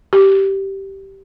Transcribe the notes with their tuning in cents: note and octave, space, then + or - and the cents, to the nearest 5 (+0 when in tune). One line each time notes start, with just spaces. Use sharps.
G4 -10